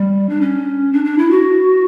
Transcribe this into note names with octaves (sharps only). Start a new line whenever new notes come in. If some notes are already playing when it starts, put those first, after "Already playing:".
Already playing: G3
D4
C#4
D4
D4
E4
F#4